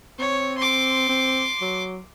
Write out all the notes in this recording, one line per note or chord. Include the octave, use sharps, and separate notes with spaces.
C4 C#5
C6 D6
C4
F#3